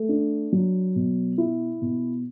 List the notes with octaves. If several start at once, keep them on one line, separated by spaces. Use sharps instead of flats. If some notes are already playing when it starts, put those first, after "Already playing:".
Already playing: A3
D4
F#3
B2
E4
B2